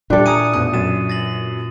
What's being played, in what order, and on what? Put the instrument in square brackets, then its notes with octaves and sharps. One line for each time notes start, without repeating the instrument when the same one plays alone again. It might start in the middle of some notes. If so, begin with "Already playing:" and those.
[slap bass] A#2 E3 [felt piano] G3 [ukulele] D4 A4
[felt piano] G#5 A#5 [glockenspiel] D#6 C#7 D#7
[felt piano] A1 B2 D#6 [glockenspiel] F#6
[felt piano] F#2 [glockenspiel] A6 D#7 E7
[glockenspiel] A6 A#6 F#7